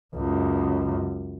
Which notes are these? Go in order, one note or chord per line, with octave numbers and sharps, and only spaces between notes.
C#2 F#2